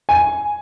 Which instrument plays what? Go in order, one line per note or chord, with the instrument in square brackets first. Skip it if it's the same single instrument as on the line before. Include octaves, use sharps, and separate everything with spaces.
[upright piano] G#5